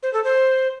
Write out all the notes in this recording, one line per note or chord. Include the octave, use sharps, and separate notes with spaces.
C5
A4
C5